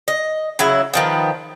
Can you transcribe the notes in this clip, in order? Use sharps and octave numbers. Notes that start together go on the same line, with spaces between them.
D#5
C#3 F#3 E4
D#3 F3 B3